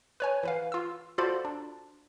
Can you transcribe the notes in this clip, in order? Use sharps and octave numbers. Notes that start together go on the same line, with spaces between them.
B4 C#5 G#5
E3 B4 F5
F4 E6
F4 F#4 A4 C5 D5 B5
D4